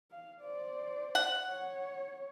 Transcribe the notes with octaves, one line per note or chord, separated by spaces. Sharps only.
F5
C5 D5
F#5
C#5